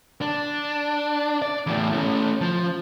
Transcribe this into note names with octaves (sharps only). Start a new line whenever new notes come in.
D4
D5
E2 A2
A3 C#4
F3